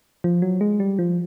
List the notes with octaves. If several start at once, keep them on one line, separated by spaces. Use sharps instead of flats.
F3
F#3
G#3
G3
F3